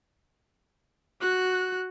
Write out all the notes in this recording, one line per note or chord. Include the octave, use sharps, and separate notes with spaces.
F#4 F#6